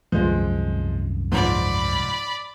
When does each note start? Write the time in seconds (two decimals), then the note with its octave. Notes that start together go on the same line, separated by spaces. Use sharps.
0.12 C2 F#2 D#3 F3 G#3
1.32 G#2 F3 D5 B5